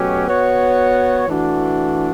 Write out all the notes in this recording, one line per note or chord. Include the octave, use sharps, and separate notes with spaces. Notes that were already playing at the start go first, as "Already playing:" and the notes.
Already playing: B2 F#3 A3 C#4 G4
B3 F#4 C#5
E3 A3 D4 F#4